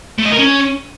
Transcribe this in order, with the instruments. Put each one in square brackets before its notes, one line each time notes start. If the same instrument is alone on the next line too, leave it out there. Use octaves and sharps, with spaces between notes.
[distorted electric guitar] A3
D#5
A#4
C#4